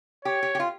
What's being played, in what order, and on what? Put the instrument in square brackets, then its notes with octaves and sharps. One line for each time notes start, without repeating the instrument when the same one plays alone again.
[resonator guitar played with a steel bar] G4 [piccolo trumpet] C#5
[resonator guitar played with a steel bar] G4
G4
F4